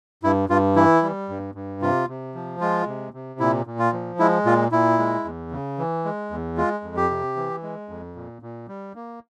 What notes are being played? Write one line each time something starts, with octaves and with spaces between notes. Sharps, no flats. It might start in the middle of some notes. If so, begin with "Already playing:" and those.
G2 E4
G2 F4
E3 E4
G3
G2
G2
C3 F4
C3
F3
G#3 F4
C3
C3
A#2 E4
A#2
F4
F3
G#3 E4
A#2 F4
A#2 E4
G#3
E2
C#3
E3
G#3
E2
G#3 F4
F2
G4
C3
E3
G#3
F2
A#2
A#2
G3
A#3